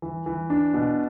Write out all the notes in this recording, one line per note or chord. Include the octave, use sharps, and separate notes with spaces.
E3
E3
D4
B2